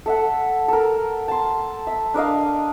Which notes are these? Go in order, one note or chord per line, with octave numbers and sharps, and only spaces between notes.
A4 E5 F#5
A4 A#4
A5 C6
E5
D4 A#4 D#5 F5